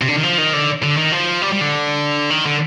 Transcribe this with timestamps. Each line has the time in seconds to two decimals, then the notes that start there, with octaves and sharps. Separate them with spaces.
0.02 C3
0.08 D3
0.16 D#3
0.23 F3
0.38 D#3
0.53 D3
0.83 D3
0.97 D#3
1.12 F3
1.42 G3
1.52 G3
1.61 D3
2.30 D#3
2.46 D3